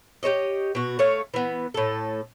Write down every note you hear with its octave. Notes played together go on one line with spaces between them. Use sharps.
G4 A4 C#5 D#5
B2 F#4
A3 C#5 F5
E3 B3
A2 A4